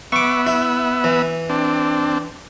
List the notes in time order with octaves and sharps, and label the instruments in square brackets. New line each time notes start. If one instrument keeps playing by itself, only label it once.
[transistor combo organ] B3 E5 [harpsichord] C#6 D6
[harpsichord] E4
E3
[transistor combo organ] C4 D4